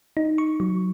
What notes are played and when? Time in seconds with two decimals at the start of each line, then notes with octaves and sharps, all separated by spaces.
0.17 D#4
0.38 C#6
0.60 F#3